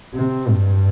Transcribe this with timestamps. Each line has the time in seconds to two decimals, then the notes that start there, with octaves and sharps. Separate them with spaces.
0.14 C3
0.50 G2